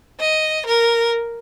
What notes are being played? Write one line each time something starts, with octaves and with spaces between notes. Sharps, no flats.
D#5
A#4